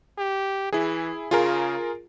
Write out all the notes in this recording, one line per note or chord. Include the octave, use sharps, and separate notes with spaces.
G4
E3 E4 G#4
C#3 F4 G#4 A#4